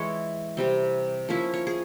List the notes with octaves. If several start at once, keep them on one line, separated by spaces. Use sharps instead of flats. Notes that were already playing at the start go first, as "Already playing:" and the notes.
Already playing: E3 G#3 E4 C#5
C3 G3 C4
F3 A#3 C#4 E4 E5
C#5
G#4